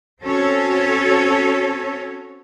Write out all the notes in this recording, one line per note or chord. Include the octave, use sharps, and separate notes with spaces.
C4 C#4 F#4 A4 C#5